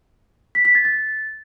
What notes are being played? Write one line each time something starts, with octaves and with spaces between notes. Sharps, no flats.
B6
B6
A6
A6